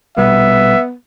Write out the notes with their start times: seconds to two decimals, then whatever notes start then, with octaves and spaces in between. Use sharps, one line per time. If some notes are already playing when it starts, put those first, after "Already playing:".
0.17 A#1 B2 G3 B3 E5